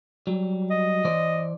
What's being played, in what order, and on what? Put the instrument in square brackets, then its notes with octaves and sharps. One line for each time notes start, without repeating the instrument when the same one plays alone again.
[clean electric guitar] F#3 G3
[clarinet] D#5
[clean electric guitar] E3 C5 D5